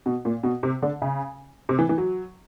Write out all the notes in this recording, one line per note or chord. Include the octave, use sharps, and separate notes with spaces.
B2
A#2
B2
C3
D3
C#3
C3
E3
E3
F#3